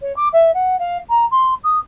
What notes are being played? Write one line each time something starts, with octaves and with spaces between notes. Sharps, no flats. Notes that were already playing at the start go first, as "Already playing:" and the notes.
C#5
D6
E5
F#5
F5
A#5
C6
D#6